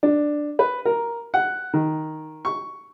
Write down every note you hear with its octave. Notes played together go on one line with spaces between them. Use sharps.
D4
B4
A#4
F#5
D#3
C#6